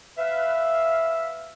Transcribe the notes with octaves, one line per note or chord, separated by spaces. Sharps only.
B4 E5 F5